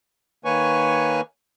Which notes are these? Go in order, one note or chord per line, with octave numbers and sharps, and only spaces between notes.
D#3 A#3 B4 C#5 G#5 C#6